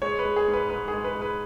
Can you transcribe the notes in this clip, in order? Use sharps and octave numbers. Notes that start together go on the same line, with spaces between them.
G#3 C#5
B4
G#3
G#4
G#2
B4
G#2 B4
G#4
G#3
B4
G#3
B4